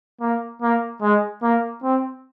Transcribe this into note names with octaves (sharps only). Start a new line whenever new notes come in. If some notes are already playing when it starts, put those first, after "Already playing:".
A#3
A#3
G#3
A#3
C4